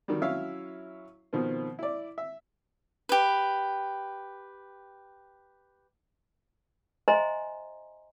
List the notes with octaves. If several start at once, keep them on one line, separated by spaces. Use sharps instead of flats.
D#3 F#3 G3
F#3 C#4 E4 C#5 E5 F5
B2 D#3 F3 C4
E4 D5
E5
G4 B4
C5 D#5 E5 G#5 A#5 C6